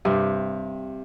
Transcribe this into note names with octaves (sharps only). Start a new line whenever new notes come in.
G2 C3